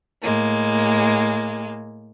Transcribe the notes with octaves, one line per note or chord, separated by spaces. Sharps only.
A2 G#3 A#3